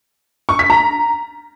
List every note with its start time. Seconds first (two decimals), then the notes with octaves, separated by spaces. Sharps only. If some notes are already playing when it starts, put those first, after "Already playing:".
0.49 C#6
0.59 B6
0.70 A#5